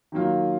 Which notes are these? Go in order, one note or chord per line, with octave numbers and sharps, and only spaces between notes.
D#3 F#3 A#3 F4